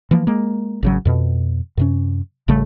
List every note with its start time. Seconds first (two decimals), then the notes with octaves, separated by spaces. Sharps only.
0.11 E3 F3 A#3
0.27 G#3 A#3
0.83 G#1 C#3 F#3
1.05 F2 B2
1.77 F#2 C3 C#4
2.48 G#1 C#3 G3 A3